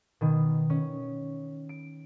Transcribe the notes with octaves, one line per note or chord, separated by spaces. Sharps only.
B2 D#3
C#4
D7